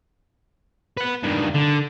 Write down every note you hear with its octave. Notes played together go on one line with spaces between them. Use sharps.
B4 F#5
G2 D#3
D3